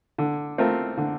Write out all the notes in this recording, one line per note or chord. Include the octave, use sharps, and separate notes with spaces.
D3
A3 C4 F4 A#4
D3